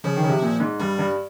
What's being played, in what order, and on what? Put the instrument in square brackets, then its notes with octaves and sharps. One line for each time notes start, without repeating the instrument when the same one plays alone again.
[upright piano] C#3 [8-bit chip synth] F3
[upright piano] D#3
C#3
C3
A#2
G#2
[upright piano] G2 [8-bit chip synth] G3
[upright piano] G2